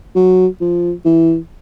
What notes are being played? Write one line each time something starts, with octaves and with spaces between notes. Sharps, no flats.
F#3
F3
E3